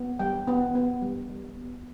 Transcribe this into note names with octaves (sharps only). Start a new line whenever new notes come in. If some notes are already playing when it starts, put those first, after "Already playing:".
Already playing: B3
G3 G5
B3
B3
G3
G3
B3